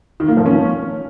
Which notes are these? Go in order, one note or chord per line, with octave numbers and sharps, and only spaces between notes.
D#3
A#3
F3
C#4